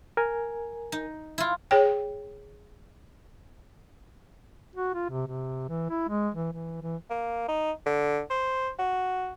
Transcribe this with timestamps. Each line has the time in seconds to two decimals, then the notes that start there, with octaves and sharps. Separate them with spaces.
0.17 A#4 G#5
0.92 D#4
1.38 E4 F4
1.71 G#4 C#5 G5
4.76 F#4
4.94 F4
5.10 C3
5.27 C3
5.69 E3
5.90 E4
6.08 G#3
6.34 E3
6.53 E3
6.82 E3
7.10 A#3
7.48 D#4
7.86 D3
8.30 C5
8.79 F#4